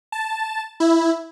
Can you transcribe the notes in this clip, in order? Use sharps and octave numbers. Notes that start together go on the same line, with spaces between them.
A5
E4